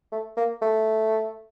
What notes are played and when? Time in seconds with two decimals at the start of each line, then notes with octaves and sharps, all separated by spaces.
0.12 A3
0.37 A#3
0.62 A3